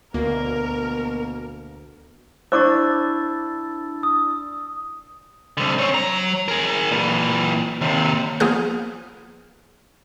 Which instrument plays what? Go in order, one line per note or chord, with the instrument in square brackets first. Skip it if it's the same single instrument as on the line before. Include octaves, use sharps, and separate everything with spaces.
[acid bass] D2 [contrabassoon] B2 [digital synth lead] A#3 [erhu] A#4
[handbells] D4 E4 D5 [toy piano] C5 C#6 D6 [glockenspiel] E6 A6
[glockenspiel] D#6
[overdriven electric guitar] C2 D3
C4 C#5
F#3 A#5
G#4 A#4
A#2 E3
D#2 C3
[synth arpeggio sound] F3 A#3 B3 G#4 F6